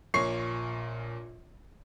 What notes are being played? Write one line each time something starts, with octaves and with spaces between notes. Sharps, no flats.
A#1 A#2 C#5 C#6 C7